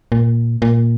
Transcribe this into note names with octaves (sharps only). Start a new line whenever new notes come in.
A#2
A#2